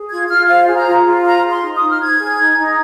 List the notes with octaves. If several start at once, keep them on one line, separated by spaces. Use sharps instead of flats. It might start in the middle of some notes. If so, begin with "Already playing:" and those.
Already playing: G#4
F4 G#6
F4 F6
C5 F5
G#4
A#5
F4
F4
C5 A#5
G#4
C6
D#4
D#6
D#4
F6
C5 G#6
G#4
D#4
D#4